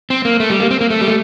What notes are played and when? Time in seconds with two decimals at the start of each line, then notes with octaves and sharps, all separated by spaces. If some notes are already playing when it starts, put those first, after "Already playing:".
0.10 C4
0.25 A#3
0.40 A3
0.50 G3
0.60 A#3
0.71 C4
0.81 A#3
0.90 A3
1.01 G3
1.08 A3